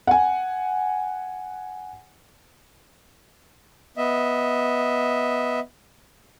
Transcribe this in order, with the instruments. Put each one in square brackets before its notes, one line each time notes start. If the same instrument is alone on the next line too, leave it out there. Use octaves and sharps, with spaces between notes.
[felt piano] F#5 G#5
[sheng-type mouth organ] B3 D#5 E5